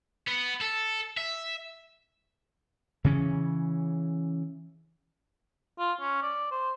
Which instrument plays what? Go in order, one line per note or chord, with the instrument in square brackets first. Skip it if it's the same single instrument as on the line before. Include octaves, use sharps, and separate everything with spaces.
[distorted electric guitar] B3
A4
E5
[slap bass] C#3 E3 C#4
[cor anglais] F4
C#4
D5
C5